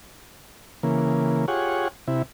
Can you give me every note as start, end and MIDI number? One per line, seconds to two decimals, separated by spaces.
0.83 1.46 49
0.83 1.46 52
0.83 1.46 58
1.48 1.88 65
1.48 1.88 67
1.48 1.88 68
1.48 1.88 73
1.48 1.88 78
2.08 2.22 48
2.08 2.22 64